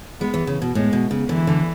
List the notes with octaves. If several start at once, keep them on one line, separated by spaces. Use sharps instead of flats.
G#3 B3
E3
C#3
B2
A2 G#3
B2
C#3
D3 E3
D3